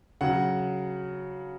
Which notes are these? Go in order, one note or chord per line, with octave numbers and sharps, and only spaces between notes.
C#3 F#3 F#5